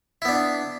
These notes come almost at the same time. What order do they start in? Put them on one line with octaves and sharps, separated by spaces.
E4 B3 D4